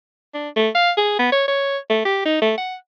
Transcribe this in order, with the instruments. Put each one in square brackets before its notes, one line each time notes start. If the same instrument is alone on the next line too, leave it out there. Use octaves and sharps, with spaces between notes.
[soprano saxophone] D4
A3
F5
G#4
B3
C#5
C#5
A3
G4
D#4
A3
F#5